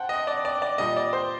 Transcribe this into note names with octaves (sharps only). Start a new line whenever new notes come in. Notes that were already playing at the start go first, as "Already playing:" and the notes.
Already playing: C5 F#5 G5 A5
D#5
D5
D5
D5
A#2 G3 D#5
D5
C5